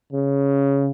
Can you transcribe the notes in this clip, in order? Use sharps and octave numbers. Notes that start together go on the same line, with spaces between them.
C#3